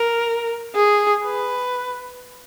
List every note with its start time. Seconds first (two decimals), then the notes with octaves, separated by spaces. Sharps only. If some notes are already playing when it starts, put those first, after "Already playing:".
Already playing: A#4
0.76 G#4
1.24 B4